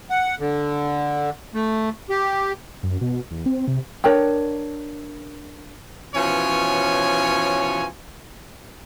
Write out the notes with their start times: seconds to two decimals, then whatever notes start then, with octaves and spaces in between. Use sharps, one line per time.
0.10 F#5
0.40 D3
1.54 A3
2.10 G4
2.83 F#2
3.01 B2
3.31 E2
3.46 C4
3.67 C3
4.04 D4 A#4 C#5 G5
6.15 B2 E3 F3 C#4 C#5 G#5